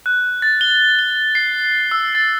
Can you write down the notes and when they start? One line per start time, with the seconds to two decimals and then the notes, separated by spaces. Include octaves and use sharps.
0.06 F#6
0.42 A6
0.61 G7
0.99 G7
1.35 C7
1.92 E6
2.15 A6